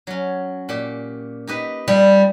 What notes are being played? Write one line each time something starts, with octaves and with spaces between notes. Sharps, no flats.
F#3 C#4
A#2 G4
D#4 G4 B4
F3 G3